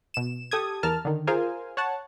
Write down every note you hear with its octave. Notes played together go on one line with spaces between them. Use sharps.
B2 E7
G4 A4 D#6 G#6
E2 A#4 A5 F6
D3 D#3
F4 G#4 A#4 C5 F5 G#5
C#5 F#5 A5